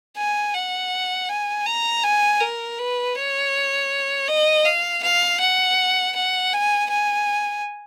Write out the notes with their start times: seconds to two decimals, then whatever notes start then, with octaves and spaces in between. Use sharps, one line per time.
0.16 G#5
0.54 F#5
1.29 G#5
1.66 A#5
2.04 G#5
2.40 A#4
2.78 B4
3.15 C#5
4.28 D#5
4.65 F5
5.03 F5
5.40 F#5
6.16 F#5
6.53 G#5
6.90 G#5